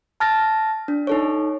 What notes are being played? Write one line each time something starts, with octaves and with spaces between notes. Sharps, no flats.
A5 F6 A6 A#6
D4
D#4 A4 C#5